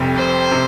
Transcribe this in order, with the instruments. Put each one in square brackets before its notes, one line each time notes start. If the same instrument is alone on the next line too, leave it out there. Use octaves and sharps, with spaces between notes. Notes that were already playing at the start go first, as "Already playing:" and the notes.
Already playing: [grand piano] F1 F2 C3 G3
[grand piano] F1 [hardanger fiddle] C5
[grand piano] C3